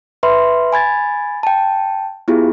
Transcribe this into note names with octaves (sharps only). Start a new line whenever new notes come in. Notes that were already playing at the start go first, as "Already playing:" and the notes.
B4 E5 B5 C6
G#5 B5 G#6 A6
G5 A5
B3 E4 F4 G4 G#4